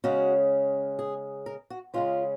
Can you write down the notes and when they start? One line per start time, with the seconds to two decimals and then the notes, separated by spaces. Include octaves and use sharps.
0.04 C#3 G#3 C#4 F#4
0.99 G#4
1.46 A#4
1.70 F#4
1.94 C#3 G#3 C#4 F4